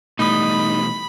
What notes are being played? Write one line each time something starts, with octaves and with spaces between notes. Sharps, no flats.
B2 E3 G3 A3 D#4 B5 D#6